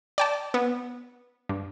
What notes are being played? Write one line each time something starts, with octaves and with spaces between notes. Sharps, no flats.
D5 G5 A5
B3
G2